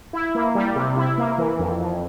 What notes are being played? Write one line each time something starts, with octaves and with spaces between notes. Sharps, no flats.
E4
A#3
G3
C3
E4
A#3
E3
F2
F2